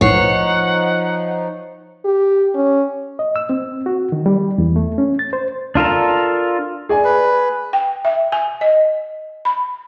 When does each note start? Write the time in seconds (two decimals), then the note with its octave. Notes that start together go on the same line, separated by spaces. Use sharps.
0.01 B1 A2 F3 D#4 C#5 F#5 C7
2.05 G4
2.55 C#4
3.19 D#5
3.36 E6
3.49 C4
3.86 F#4
4.12 D#3
4.26 G3
4.58 E2
4.76 A3
4.98 C#4
5.19 A6
5.33 C5
5.75 D4 F4 A4 A#4
6.89 G#4 D5 G#5
7.04 B4
7.73 G5
8.05 E5
8.32 G#5
8.61 D#5
9.45 B5